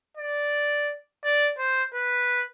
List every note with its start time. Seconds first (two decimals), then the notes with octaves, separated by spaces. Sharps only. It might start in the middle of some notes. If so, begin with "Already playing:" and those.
0.17 D5
1.24 D5
1.59 C5
1.94 B4